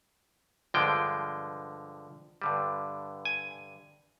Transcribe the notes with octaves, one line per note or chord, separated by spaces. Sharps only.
G2 D3 F3 G#3 G5
G2 D3 G3
G#5